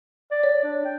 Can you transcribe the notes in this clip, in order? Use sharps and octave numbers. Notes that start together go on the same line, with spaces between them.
D5
C#5
D4
G5